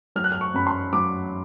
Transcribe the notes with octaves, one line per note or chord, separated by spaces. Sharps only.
F#3 F6
F#6
F6
C#6
F#2 B5
C6
F#3 D6